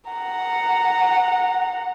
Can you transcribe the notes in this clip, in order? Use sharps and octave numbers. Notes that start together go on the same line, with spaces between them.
F#5 A#5